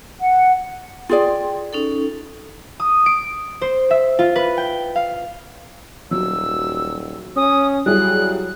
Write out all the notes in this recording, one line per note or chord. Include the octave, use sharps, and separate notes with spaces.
F#5
F4 G#4 D5 G5 C6
C#4 D#4 A4
D#6
D7
C5
E5
F4
B4
G5
F5
D#1 F#3 E6
C#4 D#6
F#3 G3 E4 G#4 F#6